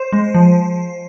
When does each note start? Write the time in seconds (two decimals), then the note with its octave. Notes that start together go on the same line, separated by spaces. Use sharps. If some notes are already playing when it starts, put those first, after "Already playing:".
Already playing: C5
0.12 G#3
0.34 F3